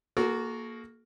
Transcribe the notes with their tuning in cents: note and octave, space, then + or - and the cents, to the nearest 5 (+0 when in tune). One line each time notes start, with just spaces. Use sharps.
A#3 +0 F#4 +0 A4 -40